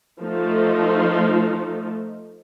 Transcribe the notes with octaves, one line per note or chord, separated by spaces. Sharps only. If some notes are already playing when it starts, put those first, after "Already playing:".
F3 A3 D#4